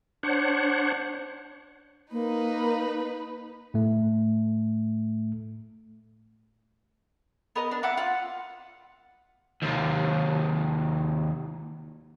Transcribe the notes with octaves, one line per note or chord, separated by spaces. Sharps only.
D4 C5 C#5 F#5
A#3 D#4 B4
A2 A3
B3 A#4 D#5
D4
E4 F#5 D6
F4 F#5
D#2 C3